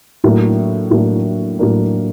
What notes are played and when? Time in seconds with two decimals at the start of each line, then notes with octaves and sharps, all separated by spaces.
0.24 A2 F#3 A#3 D4
0.91 A2 F#3 A#3 D4
1.59 A2 F#3 A#3 D4